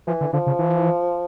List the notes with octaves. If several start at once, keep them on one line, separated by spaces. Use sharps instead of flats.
E3 F3
D3
D3 F3
C#3
E3